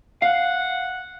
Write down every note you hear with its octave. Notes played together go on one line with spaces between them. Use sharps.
F5 F#5